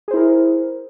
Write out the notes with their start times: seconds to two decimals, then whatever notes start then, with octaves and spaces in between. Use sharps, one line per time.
0.08 G#4
0.11 C5
0.14 E4
0.16 A#4